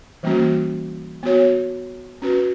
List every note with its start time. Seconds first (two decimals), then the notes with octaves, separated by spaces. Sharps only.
0.23 E3 G3 A#3 C#4 F#4
1.23 B3 F#4 C#5
2.22 C#4 F#4 B4